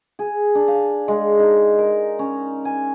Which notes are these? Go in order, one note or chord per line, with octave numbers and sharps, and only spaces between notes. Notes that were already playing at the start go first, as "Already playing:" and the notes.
G#4
D4
F5
G#3
D#4
A#4
C#4
G#5